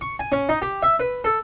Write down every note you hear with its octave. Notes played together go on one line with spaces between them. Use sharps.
C#6
G#5
C#4
D#4
G4
E5
B4
A4